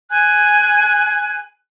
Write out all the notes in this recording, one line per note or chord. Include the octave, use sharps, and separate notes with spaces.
G#5 F#6 G#6